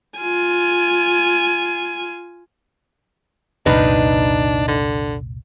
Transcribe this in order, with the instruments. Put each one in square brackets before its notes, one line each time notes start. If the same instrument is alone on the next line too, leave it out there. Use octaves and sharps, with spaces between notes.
[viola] F4 G#5
[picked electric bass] F1 C2 A#2 [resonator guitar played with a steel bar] D#3 D#4 B4 [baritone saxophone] D4
[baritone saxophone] D3